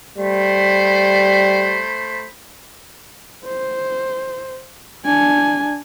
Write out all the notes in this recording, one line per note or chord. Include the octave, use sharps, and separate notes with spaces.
G3 A3 C5 B5
C5
D4 G#5